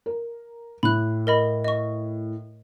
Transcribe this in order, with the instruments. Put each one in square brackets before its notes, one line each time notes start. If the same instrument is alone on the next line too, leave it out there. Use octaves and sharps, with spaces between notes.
[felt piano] A#4
[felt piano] A2 [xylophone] B5 F#6
[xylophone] A#4 D#5 B5
D#5 C#6